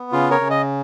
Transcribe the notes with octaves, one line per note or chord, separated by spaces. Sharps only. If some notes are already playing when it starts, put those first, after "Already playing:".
Already playing: B3
C#3 F4
A#4 C#5
C#3
D#5